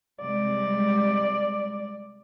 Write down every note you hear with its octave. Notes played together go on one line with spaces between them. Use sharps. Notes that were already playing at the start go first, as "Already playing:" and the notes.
C3 G3 G#3 D5